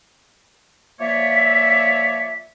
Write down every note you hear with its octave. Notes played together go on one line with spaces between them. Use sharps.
F3 A#3 C#5 D5 E5